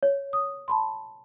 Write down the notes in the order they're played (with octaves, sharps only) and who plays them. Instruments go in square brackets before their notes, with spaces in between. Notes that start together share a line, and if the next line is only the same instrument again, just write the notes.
[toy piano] C#5
[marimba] D#6
A5 B5 C6